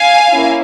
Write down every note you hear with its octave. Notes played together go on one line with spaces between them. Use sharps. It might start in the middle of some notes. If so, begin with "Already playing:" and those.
Already playing: F5 G#5
A#3 C#4 E4